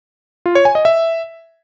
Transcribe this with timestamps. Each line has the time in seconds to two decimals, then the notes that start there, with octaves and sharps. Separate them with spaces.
0.46 F4
0.55 C#5
0.65 G#5
0.75 D#5
0.85 E5